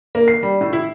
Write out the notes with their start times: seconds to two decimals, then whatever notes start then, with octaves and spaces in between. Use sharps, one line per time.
0.15 A#3
0.28 C7
0.43 G3
0.61 A2
0.73 E4